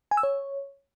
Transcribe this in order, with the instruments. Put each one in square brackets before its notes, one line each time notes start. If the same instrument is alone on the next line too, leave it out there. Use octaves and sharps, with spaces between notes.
[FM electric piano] G#5
E6
C#5